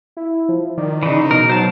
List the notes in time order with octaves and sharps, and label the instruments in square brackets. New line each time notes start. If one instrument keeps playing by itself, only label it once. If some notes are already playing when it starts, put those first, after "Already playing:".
[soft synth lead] E4
F3
[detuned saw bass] D#3 [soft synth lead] D5
[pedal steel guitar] C#3 E3 [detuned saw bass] D#4
[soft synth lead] B2 [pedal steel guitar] A#4
[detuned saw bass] F#3 [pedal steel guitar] C5 A5